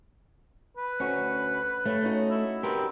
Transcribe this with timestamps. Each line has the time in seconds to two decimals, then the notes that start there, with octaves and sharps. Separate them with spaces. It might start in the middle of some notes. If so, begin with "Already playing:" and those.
0.77 B4
1.00 D2 C#4 F#4
1.86 G2 A3 C#5
2.03 C#4 D#4 F#4
2.30 E4
2.63 C4 G4 A#4 B4